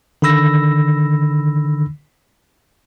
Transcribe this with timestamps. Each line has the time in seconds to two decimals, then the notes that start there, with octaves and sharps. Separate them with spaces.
0.22 D3 D#3 B5 E6 A#6